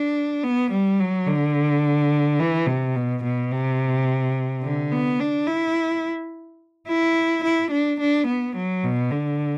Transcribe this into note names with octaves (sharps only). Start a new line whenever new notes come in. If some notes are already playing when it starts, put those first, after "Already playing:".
Already playing: D4
B3
G3
F#3
D3
E3
C3
B2
B2
C3
D3
B3
D4
E4
E4
E4
D4
D4
B3
F#3
B2
D3